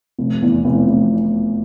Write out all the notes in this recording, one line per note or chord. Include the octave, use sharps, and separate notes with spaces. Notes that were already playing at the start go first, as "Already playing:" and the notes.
F1
E2
F1
F1